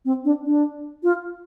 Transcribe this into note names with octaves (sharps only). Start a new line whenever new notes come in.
C4
D4
D4
F4